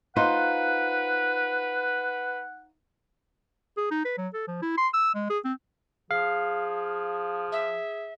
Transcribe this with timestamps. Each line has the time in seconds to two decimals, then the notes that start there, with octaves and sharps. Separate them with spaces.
0.16 D#4 F4 B4 C5 F#5
3.77 G#4
3.91 D#4
4.05 B4
4.18 F#3
4.34 A4
4.47 F3
4.62 E4
4.78 C6
4.94 E6
5.15 G#3
5.30 G#4
5.45 C4
6.11 F3 G#4 F5
7.52 E5